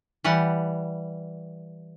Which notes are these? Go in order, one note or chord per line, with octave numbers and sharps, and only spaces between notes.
E3 G3 G4 F#5